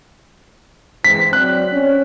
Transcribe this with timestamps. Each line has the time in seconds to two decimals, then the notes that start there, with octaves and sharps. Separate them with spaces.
1.04 E3 G#3 C4 B6
1.33 F#3 C4 D5 F#6
1.72 C#4